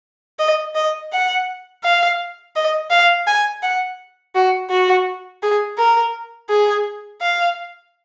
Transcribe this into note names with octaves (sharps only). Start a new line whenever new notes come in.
D#5
D#5
F#5
F5
D#5
F5
G#5
F#5
F#4
F#4
G#4
A#4
G#4
F5